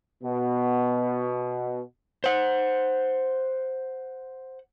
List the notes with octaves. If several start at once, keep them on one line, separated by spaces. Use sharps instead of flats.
B2 B3
C5 F#5